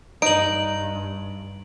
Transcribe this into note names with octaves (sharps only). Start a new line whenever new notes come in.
G2 D#4 D7 F#7